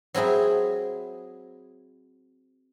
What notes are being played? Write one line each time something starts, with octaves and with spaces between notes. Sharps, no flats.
F#3 C4 E4 G#4 E5